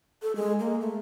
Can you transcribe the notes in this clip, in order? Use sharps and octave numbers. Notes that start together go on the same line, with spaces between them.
A4
G#3
A#3
A3